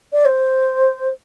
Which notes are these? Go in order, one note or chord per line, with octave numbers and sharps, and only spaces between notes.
D5
C5